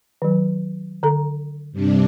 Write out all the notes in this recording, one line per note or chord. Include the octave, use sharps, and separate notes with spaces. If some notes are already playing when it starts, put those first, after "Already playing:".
D#3 F#3
D3 A4 A#5
G2 C3 D4